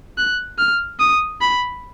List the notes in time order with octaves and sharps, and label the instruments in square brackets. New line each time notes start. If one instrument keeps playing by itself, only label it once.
[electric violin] F#6
F6
D#6
B5